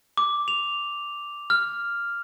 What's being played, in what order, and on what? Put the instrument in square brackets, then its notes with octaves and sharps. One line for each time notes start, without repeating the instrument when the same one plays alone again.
[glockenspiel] D6
F7
F6